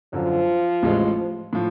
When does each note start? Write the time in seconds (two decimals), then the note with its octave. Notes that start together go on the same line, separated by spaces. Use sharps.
0.13 F#2 D3 F3 F#3
0.83 A1 A2 G#3
1.53 A2 F3